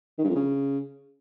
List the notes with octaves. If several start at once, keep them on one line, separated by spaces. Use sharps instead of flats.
D#3
G2
F2
C#3